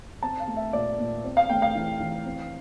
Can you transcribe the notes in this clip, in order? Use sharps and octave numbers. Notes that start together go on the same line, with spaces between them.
C4 A5
F5
A3
E5
A#2 D5
A#2
C4
F5
A3 G5
F5
E3
E3
C4